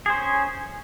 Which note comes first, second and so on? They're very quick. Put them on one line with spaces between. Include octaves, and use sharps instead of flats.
G#4 C5 C#4